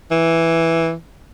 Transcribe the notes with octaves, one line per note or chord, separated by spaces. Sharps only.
E3